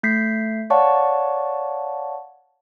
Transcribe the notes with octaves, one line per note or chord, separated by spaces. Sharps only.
A3 G6 B6 C7
C#5 D5 F5 F#5 A5 C#6